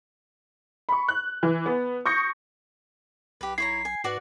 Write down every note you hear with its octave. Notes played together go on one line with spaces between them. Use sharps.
B5 C#6
F#6
E3
B3
C#6 D#6 G6 A#6 C#7
B1 G4 B4
E4 C#5 A#5 C7
G#5
G#2 F#4 B4 D5 F#5